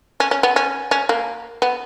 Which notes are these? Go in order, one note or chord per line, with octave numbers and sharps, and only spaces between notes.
C#4
C#4
B3
C#4
C#4
A#3
B3